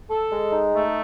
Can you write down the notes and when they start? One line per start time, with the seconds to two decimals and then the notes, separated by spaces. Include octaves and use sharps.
0.09 A4
0.31 G#3
0.53 D#4
0.74 A3